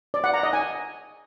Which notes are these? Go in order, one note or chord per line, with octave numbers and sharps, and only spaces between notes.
D5
F#5
A#5
D#5
G#5